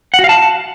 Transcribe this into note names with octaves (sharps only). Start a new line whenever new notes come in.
F#5
F#4
F5
A5